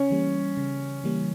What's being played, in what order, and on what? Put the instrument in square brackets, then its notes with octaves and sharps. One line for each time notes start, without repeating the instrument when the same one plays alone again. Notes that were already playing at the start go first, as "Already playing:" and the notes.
Already playing: [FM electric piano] C#3 [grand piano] C#4
[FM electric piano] E3 G3 A#3
C#3
E3 G3 A#3